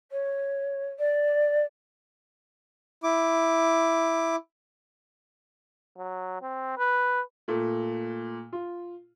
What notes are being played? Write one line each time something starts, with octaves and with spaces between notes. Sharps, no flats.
C#5
D5
E4 D6
F#3
C4
B4
A#2 A3
F4